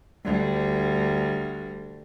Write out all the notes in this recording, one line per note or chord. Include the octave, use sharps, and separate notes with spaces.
D2 G3